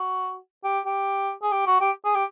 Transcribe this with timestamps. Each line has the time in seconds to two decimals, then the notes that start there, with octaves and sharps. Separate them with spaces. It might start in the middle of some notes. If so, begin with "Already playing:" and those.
Already playing: F#4
0.64 G4
0.86 G4
1.42 G#4
1.52 G4
1.67 F#4
1.81 G4
2.05 G#4
2.15 G4